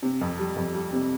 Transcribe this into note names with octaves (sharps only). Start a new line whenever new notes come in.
C3
F2
G3
F2
G3
C3